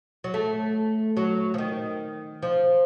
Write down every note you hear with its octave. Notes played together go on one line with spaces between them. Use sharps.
F#3
A3
F#3
F3
D#3
F3